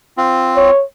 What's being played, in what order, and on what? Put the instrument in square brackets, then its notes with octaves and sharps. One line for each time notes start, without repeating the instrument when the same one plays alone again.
[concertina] C4 F4
[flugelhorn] C#5